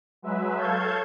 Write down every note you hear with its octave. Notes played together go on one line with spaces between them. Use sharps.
F#3 G#3 B4 E5
A4 C#5 F5 A5 G6 G#6